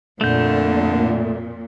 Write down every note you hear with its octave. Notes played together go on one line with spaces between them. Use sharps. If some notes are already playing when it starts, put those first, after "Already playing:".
F2 A#2 D3 A3 G6